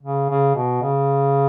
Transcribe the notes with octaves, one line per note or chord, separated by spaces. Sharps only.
C#3
C#3
B2
C#3